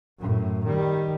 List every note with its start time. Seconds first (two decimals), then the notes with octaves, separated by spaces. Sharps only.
0.19 F#2 A2
0.64 D#3 G3